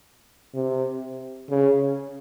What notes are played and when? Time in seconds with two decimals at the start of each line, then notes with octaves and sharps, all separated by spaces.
0.55 C3
1.50 C#3